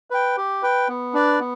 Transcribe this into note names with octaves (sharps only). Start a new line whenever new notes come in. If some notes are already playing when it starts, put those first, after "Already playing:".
B4 G5
G4
B4 G5
B3
D4 B4 D5
B3